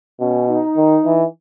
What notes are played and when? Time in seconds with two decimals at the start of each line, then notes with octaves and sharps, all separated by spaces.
0.21 B2 C#4
0.49 D#4
0.77 D#3
1.05 E3